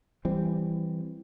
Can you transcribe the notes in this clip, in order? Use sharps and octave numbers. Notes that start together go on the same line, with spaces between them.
E3 G3 C4